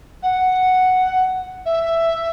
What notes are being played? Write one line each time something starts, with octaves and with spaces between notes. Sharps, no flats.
F#5
E5